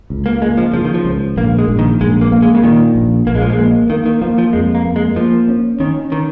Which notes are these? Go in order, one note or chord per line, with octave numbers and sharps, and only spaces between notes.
C#2
A#3
G#3 A#3
F3
C#3 F3
D#3
F3
C#2
A#1 A#3
G#3
A#1
D#3
A#1 G#3
A#3
A#3
G#3
C#3
A#2 D#3
A#1
A#1 A#3
G#3
F3
G#3
A#3
D#3 A#3
D#3
F3 A#3
F3
F2 G#3
A#3
A#3
G#3
F3 A#3
C#4
D#3 C#4
D#3